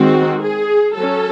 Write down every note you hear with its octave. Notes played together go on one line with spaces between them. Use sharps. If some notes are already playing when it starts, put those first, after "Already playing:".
Already playing: D#3 G#3 C4 F#4
G#4
F#3 C#4 A4